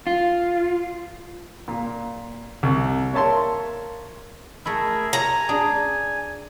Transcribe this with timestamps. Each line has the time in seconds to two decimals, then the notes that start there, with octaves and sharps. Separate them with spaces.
0.07 F4
1.68 A#2
2.63 C2
3.13 A#3 C#5 E5 A5 C6
4.65 A3 E4 G#4 A#4 E5
5.13 G#5 A#5
5.49 D4 G#4